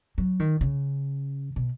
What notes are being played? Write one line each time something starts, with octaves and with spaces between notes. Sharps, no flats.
F#3
D#3
C#3
B2